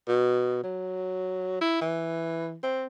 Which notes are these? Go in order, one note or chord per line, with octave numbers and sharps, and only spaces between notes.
B2
F#3
E4
E3
C4